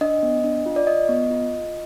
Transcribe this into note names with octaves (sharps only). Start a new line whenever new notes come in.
D4 D#5
B3
D4
F4
D5
F4 D#5
B3
F4
F4